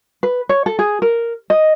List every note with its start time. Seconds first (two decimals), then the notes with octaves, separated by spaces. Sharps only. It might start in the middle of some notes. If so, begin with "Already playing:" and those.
0.23 B4
0.49 C#5
0.66 A4
0.79 G#4
1.02 A#4
1.50 D#5